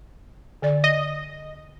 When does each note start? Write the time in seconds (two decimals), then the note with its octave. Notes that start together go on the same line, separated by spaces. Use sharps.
0.62 D3 D5
0.84 D#5